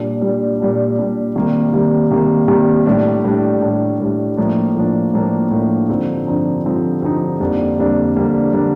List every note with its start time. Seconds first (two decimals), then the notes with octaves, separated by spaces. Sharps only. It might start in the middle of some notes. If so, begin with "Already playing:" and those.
Already playing: A#2 G3 D4
0.21 A#2 G3 D4
0.60 A#2 G3 D4
0.98 A#2 G3 D4
1.36 C3 D#3 G3 A#3
1.73 C3 D#3 G3 A#3
2.11 C3 D#3 G3 A#3
2.48 C3 D#3 G3 A#3
2.86 A2 G3 D4
3.24 A2 G3 D4
3.62 A2 G3 D4
4.00 A2 G3 D4
4.37 A2 F3 A#3 D4
4.76 A2 F3 A#3 D4
5.14 A2 F3 A#3 D4
5.51 A2 F3 A#3 D4
5.89 G2 D3 F3 C4 D#4
6.27 G2 D3 F3 C4 D#4
6.64 G2 D3 F3 C4 D#4
7.02 G2 D3 F3 C4 D#4
7.40 F2 D3 G3 A#3 D4
7.77 F2 D3 G3 A#3 D4
8.16 F2 D3 G3 A#3 D4
8.53 D3 G3 A#3 D4